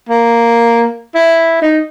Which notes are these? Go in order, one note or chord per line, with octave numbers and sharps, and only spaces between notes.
A#3
E4
D#4